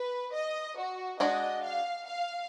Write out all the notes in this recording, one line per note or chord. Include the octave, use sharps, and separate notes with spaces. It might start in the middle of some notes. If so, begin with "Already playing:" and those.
Already playing: B4
D#5
F#4
G#3 D4 F#4 D5 D#5
F5
F5